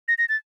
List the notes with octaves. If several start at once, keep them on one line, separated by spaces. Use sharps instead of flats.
A#6
A#6
A6